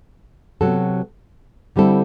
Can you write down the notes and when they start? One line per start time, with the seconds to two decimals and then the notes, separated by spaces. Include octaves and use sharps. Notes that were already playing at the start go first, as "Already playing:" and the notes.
0.61 C3 F#3 B3 F#4 A4
1.76 D3 G3 C4 E4 A4